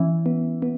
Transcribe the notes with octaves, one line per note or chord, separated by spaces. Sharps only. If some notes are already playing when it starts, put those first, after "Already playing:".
Already playing: E3 C#4
B3
B3